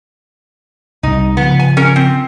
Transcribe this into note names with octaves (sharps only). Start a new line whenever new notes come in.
C2 G3 D#4
C#3 F3 B3
G#5
C#4 A#4
C4